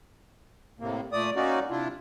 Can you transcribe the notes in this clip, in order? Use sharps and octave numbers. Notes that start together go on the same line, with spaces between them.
A2 C3 A#3
A#2 A3 D5 D#6
A#3 C#4 D#4 F#4 D5
C3 D4 E4 F4